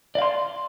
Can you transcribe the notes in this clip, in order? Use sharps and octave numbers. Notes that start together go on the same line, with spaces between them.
D5 F5 C6